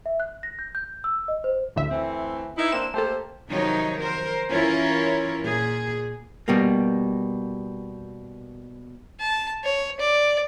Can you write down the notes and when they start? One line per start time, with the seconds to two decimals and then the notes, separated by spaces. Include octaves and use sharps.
0.06 E5
0.20 F#6
0.43 A#6
0.59 G6
0.75 G6
1.04 E6
1.28 D#5
1.44 C5
1.76 A1 D2 E5
1.91 E3 A3 C4
2.57 D#4 E4
2.72 A#3 C4 D4 E7
2.94 A3 A#3 G4 A4 C5
3.49 C3 D#3 F3 F#3 D#4 C#5
3.99 A#4 C5
4.49 E3 C#4 E4 F4 A#4 C#5
5.42 A#2 G#4
6.48 B2 G3 A#3
9.20 A5
9.64 C#5
10.00 D5